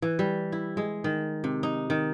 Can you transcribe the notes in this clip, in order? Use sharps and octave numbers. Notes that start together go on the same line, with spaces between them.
E3
G3
E4
G#3
D#3
C3
D#4
D#3